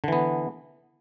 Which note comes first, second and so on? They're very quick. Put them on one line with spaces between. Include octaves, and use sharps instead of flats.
D3 E3 B3